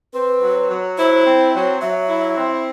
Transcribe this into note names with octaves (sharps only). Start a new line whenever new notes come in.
C4 B4
F#3
F#3
E4 C5
C4
F#3
F#3 E5
E4
C4